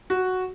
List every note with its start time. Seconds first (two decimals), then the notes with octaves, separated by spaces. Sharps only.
0.10 F#4